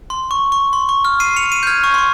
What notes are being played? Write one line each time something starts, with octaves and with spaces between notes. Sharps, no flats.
C6
C#6
C#6
C6
C#6
F6
C7 D#7
C#7 F7
C7 D#7
G6
F6 G#6
C#6
C6
C#6